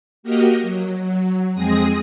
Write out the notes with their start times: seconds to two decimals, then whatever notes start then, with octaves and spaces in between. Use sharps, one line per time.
0.23 A#3 F#4 G4 A#4 D#5
0.60 F#3
1.01 F#3
1.54 F2 G#3 C4 G#4 D#6 A#6